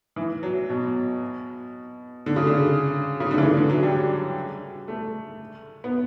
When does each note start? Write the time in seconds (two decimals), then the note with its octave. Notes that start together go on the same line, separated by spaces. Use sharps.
0.16 E3
0.43 F#3
0.70 B2
2.26 D3
2.36 C#3
2.47 D3
3.20 C#3
3.31 D3
3.38 E3
3.45 D3
3.57 D3
3.70 F#3
3.83 G3
4.88 A3
5.84 B3